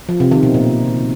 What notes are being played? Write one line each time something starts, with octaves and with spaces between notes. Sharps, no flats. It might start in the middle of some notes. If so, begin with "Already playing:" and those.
F3
C3
D#3
B2
A#2